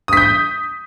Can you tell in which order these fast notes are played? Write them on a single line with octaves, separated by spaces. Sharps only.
D#6 B6 G6